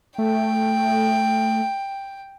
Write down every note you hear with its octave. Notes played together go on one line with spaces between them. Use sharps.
A3 G5